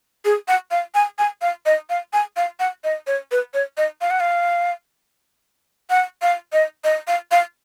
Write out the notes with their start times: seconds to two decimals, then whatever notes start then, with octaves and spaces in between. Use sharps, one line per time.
0.25 G#4
0.48 F#5
0.71 F5
0.95 G#5
1.19 G#5
1.42 F5
1.66 D#5
1.90 F5
2.13 G#5
2.37 F5
2.60 F#5
2.84 D#5
3.07 C#5
3.32 B4
3.54 C#5
3.77 D#5
4.01 F5
4.10 F#5
4.20 F5
5.90 F#5
6.22 F5
6.53 D#5
6.84 D#5
7.08 F5
7.31 F5